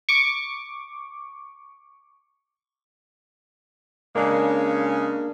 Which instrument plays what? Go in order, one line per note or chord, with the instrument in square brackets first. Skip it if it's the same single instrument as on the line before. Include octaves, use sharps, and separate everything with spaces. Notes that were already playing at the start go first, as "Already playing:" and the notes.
[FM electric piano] C#6 D6
[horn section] C#3 G#3 [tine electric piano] A#3 D4